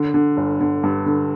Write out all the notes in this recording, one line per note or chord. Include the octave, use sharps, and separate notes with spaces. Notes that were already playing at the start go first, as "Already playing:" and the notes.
Already playing: D3
D3
G1
D3
G2
D3